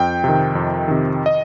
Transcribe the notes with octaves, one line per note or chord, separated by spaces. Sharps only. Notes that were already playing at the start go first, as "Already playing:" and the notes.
Already playing: F2 G5
C3 D#3
F2
C3 D#3
D#5